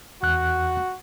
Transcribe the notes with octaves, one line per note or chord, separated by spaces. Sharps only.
E2 F#4 F#6